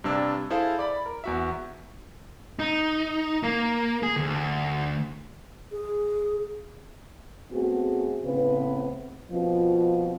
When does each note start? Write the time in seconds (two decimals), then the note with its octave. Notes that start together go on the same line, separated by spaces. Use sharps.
0.04 G2 C3 D4 E6 G#6
0.50 E4 G#4 A4 C5 F5
0.79 D5 B5
1.06 A#4
1.24 E2 F#4 E5
2.59 D#4
3.43 A#3
4.03 G#4
4.17 D2
5.72 G#4
7.52 A3 B3 C4 F#4 G#4
8.25 A2 C#3 B3 C4 B4
9.30 B2 F3 C4 F4